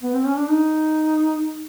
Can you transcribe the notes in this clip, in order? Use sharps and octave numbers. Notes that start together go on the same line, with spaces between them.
B3
C4
C#4
D4
D#4